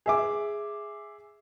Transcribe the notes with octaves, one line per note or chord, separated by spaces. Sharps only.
G#4 E5 D6